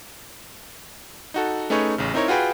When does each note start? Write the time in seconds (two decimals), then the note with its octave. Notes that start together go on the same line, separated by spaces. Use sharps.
1.34 D#4 F#4 A4
1.70 A3 C#4 D#4 G#4 B4 C#5
1.98 A1 C#3
2.14 C4 D#4 E4 A#4 C#5
2.28 F4 F#4 G#4 B4 G5